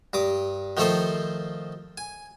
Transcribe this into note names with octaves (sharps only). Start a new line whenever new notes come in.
G2 D6 D#6
D#3 F3 A3 A4 C5
G#5